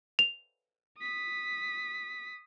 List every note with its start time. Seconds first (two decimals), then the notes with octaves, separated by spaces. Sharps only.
0.19 F7
0.99 D#6 B6